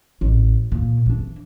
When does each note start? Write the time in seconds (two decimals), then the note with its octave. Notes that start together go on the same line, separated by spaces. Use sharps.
0.21 A1
0.72 A#2
1.06 E3 D4